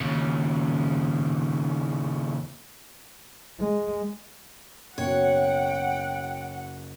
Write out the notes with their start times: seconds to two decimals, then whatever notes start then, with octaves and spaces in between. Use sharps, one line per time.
0.01 D#2 C#3
3.59 G#3
4.98 F#1 B2 F#4 C#5 F#5 G5